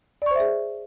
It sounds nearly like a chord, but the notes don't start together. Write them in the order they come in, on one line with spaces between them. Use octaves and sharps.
D5 C#6 C5 E5 G#4